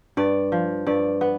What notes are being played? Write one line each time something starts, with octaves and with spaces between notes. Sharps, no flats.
G2 D5
F3
G2 D5
B3